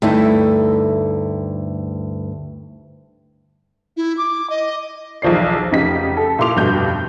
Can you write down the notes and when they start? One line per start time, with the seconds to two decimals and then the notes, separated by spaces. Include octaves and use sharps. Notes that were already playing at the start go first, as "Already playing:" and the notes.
0.02 D2 G2 A3 D#4 E4
3.97 E4
4.17 D6
4.50 D#5
5.22 B1 E2 F3 D5 C7
5.71 F1 C#3 D#4 G4 B6
6.17 A4
6.39 A#2 E4 G4 C6 D6 F7
6.56 F1 G2 B2 G6